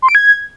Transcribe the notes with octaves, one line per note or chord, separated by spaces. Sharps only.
C6
D7
G#6